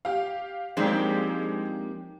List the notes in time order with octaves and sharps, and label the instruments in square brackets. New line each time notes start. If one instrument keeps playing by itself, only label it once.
[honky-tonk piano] G4 F5
[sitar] F3 A#3 G4 [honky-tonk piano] G#3 D4 [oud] C4 D#4 C5